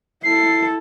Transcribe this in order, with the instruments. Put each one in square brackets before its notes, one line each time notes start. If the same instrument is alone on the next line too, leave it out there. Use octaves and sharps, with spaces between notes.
[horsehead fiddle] E4 A4 [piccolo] C7